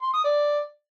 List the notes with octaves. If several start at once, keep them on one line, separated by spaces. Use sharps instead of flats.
C6
D#6
D5